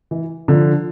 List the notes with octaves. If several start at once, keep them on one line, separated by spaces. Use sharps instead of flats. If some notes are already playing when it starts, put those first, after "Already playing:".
E3
D3 F3